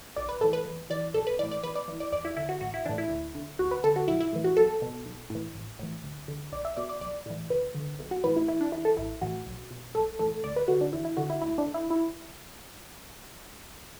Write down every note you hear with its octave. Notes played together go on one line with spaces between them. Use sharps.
B1 D5
B4
A2 E3 A4
B4
E2
E3 D5
B1 A4
B4
A2 E3 D5
D5
E2 B4
D5
E3
D5
E2 D5
E4
D3 E4
F#4
A1 F#4
E4
A2 E3 D4
E4
D2
D3
D2 F#4
B4
D3 A4
F#4
B1 E4
E4
A2 E3
F#4
B1 A4
B2
B1
A2 E3
A1
A2 E3
D2
D3
B1 D5
E5
B2 D5
D5
B1 D5
A2 E3
D2 B4
D3
B1
F#4
A2 E3 B4
E4
E2 E4
D4
E3 E4
A4
A1 E4
A2 E3 F#4
B1
B2
B1 A4
A2 E3 A4
D2 D5
B4
D3 F#4
D4
E2 E4
E4
D3 F#4
E4
D2 E4
D4
D3
E4
E4